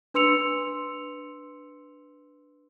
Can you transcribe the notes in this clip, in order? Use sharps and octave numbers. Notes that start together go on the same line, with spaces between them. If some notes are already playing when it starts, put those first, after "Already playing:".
D4 B4 C6 E6 C#7 F7